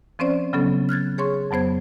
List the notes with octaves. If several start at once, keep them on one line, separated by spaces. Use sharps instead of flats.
F3 C4 C#4 C5 D5
C#3 F#3 B3 C#4 A4
F6 F#6 G#6 A6
G#4 C#5 C6 C#6
F2 F#3 B3 C5 G#6